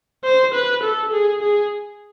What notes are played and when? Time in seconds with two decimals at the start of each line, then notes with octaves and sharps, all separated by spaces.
0.24 C5
0.54 B4
0.83 A4
1.13 G#4
1.42 G#4